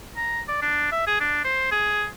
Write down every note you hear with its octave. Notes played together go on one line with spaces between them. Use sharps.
A#5
D5
D4
E5
G#4
D4
C5
G#4